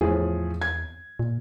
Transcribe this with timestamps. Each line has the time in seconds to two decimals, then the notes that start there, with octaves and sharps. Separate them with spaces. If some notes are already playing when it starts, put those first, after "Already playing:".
0.01 E2 A2 F3 G#4
0.62 G#6
1.19 A#2